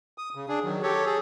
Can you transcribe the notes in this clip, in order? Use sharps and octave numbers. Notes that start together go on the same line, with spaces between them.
D#6
C#3
D4 G#4
D#3 F#3
G4 A4 C#5
G#4 A4